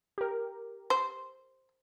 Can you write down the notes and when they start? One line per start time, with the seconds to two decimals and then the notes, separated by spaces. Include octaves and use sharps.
0.18 G4 A#4
0.90 C5